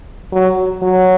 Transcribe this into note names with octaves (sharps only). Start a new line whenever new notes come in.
F#3
F#3